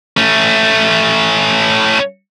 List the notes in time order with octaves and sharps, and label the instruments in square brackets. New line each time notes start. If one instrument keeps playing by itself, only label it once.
[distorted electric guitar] A3 C#4